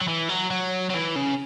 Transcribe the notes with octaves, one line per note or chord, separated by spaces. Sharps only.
F#3
E3
F#3
F#3
F#3
E3
C#3